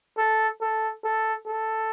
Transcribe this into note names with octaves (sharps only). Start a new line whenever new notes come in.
A4
A4
A4
A4